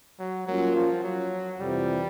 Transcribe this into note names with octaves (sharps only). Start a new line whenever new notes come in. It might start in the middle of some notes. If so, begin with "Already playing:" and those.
F#3
F#3 G3 A#3 C#4 F4
F3
F#3
F2 C3 E3 G3